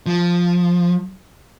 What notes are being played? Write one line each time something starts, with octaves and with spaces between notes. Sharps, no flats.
F3